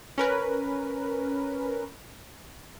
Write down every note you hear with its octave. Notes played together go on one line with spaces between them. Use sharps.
C#4 A#4 B4